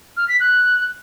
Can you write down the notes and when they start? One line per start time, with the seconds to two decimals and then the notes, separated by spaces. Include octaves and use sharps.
0.16 F6
0.28 B6
0.40 F#6